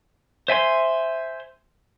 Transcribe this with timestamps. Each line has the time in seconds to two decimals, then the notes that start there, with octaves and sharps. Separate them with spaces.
0.48 C5 E5 G#5 C6